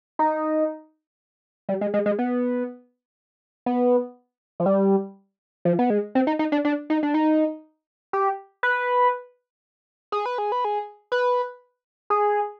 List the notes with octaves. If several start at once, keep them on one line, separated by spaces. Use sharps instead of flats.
D#4
G3
G#3
G#3
G#3
B3
B3
F3
G3
F3
B3
G#3
C4
D#4
D#4
D4
D4
D#4
D4
D#4
G4
B4
G#4
B4
G#4
B4
G#4
B4
G#4